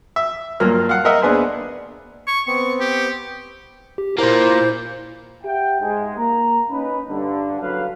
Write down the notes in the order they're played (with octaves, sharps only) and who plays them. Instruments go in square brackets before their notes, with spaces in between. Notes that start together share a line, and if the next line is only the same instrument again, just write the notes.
[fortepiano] E5
G2 A#2 F#3 A#3 F6
F5 F#5
A#4 D#5 E5 F#5
D#2 B3 D4 G#4 B4 C5
[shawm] C#6
[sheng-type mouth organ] B3 C4 [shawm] C#6
[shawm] G4
[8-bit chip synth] G4
[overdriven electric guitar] A#2 A#3 [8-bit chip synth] E4 C5 G6
[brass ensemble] G4 E5 F#5 G5
G#2 G#3
A#3 A#5
C#4 D#4 B4
G2 D3
F#1 D3 F#3 B4 F5